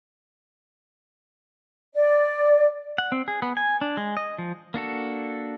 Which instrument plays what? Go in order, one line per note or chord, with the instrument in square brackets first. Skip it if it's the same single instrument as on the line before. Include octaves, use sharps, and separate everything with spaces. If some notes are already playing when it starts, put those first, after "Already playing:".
[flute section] D5
[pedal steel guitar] F#5
C4
G#4
B3
G#5
D4
G#3
D#5
F3
A#3 D4 F#4 A4